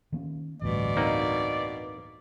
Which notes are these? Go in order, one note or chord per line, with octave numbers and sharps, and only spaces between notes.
D#3 A#3 C#4
A1 D2 G2 B2 D5
A#3 C4 D#4